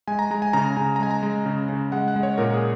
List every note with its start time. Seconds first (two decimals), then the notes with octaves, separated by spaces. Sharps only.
0.08 G#3 G#5
0.19 A#5
0.31 G#3 A#5
0.42 G#5
0.53 C#3 A#5
0.65 G#5
0.77 C#3 G#5
0.96 A#5
1.00 G#3 G#5
1.11 A#5
1.23 G#3
1.46 C#3
1.69 C#3
1.92 G#3 F#5
2.08 F#5
2.16 G#3
2.23 C#5
2.38 A#2 A#4
2.53 G#4